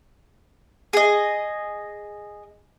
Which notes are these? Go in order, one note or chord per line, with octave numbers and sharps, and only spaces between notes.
G#4 D#5